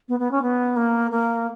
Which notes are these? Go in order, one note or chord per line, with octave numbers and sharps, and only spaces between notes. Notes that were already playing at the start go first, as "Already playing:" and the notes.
B3
B3
C#4
B3
A#3
A#3